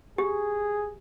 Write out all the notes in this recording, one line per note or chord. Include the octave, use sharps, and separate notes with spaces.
G4 G#4